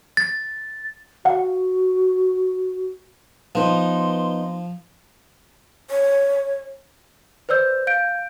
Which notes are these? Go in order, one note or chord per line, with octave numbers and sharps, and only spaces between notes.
A6
F#4 F5 F#5
F3 B3 D#4 C6
C#5
B4 C5 D5 E6 G6
F5 G6 D7